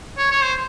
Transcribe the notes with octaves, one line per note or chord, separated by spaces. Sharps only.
C#5
C#5
C5